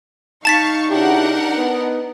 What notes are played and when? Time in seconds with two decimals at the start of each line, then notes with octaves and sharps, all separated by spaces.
0.45 D#4 F5 A5 C#6 A6 B6
0.90 C#3 D4 E4 G4 A#4 F#5
1.57 B3 D#4